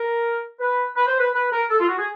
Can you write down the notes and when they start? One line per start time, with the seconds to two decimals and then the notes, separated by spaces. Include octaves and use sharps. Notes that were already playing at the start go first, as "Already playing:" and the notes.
Already playing: A#4
0.60 B4
0.96 B4
1.07 C5
1.18 B4
1.33 B4
1.52 A#4
1.70 A4
1.80 F4
1.88 F#4
1.98 G#4